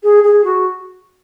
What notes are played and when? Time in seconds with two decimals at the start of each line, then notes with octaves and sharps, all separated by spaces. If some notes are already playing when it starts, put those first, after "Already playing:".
0.02 G#4
0.23 G#4
0.44 F#4